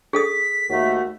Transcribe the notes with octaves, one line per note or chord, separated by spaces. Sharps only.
G#4 A4 D#6 B6
D#2 A3 F#4